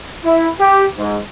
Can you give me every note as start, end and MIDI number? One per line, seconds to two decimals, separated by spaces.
0.24 0.47 64
0.59 0.84 67
0.98 1.18 44